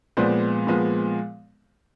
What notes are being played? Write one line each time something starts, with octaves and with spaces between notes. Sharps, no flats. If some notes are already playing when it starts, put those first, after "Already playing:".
A#2 F3 G#3 B3 C5 D5
A#2 F3 G#3 B3